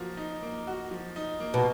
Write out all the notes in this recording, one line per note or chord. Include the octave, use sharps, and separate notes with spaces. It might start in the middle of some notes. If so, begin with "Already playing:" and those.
Already playing: F3 A#3 F#4
D#4
A#3
F#4
F3
D#4
A#3
B2